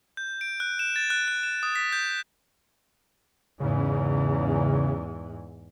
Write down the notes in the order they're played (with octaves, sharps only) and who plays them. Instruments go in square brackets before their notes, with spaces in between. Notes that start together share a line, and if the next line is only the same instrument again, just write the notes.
[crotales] G6
D7
F#6
E7
A6
F#6
F#6
E7
D#6
B6
G6
[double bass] E2 G#2 [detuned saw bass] C#3